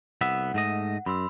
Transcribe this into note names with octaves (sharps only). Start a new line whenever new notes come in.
C2 B3 E5 F#5
G#2 A3 D#5
F#2 B5 C6 E6